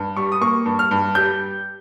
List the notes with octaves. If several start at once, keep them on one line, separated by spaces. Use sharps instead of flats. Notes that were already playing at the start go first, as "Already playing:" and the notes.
Already playing: G2
G3 C#6
D#6
A#3 C#6
G2
F6
G2
G3 G6